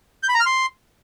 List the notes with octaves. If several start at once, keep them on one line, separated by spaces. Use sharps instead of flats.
G6
B5
A#5
F6
C6